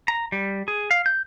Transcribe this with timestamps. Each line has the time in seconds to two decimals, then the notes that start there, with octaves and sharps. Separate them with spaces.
0.08 A#5
0.32 G3
0.68 G#4
0.91 F5
1.06 G6